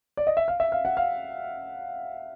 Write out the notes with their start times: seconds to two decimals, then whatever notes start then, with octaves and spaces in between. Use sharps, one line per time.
0.17 D5
0.27 D#5
0.37 E5
0.48 F5
0.60 E5
0.72 F5
0.85 F#5
0.97 F5